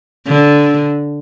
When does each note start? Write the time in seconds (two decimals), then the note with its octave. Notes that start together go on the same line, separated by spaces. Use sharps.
0.27 D3